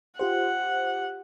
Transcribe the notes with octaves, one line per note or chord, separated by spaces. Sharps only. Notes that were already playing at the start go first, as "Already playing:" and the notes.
F4 G4 C5 F#5